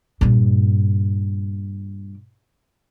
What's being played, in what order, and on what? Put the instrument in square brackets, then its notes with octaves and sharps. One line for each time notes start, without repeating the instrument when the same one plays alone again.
[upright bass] G2 A#2